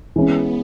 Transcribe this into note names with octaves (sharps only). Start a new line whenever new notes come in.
E3 G#3 B3 C#4